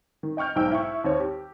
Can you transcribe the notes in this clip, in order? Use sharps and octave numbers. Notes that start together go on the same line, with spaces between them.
D#3
D#5 G5 C#6 F6 G6
B1 G#2 D#4 G5 E6
E4 C#6
D#2 C4 C#5
G4